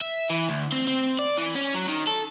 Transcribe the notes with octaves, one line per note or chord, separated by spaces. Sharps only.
E5
E3
D2
C4
C4
D5
E3
C#4
F#3
D#3
A4